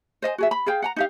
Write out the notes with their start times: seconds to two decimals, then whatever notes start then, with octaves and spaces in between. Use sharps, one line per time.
0.22 C5 D#5 F5 G#5
0.38 F#4 G#4 E5
0.51 B5
0.66 G#4 F5 G5
0.82 F#5 G5 A#5
0.96 D#4 G4 F5